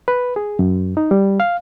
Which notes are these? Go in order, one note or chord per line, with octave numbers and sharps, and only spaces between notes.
B4
G#4
F#2
D#4
G3
F5